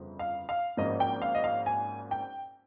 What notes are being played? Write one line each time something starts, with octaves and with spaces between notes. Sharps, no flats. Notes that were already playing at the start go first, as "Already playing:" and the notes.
Already playing: G1 F2 C#3
F5
F5
G#1 G#2 F3 A#3 C#4 D#5
G5
F5
D#5
F5
G#5
G5